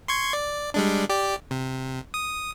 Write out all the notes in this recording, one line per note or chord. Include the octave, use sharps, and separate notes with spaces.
C6 C#6 G#6
D5
G3 G#3 D4
G4 D5
C3
D#6